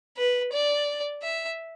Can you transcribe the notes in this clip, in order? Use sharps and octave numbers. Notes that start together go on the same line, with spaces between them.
B4
D5
E5